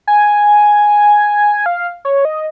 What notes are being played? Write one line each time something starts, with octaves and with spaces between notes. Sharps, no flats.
G#5
F5
C#5
D#5